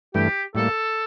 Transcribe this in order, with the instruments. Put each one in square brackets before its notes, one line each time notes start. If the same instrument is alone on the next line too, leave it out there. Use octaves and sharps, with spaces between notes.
[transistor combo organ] G2 E3 A3 [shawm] G4
[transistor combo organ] A2 G3 A#3 [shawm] A4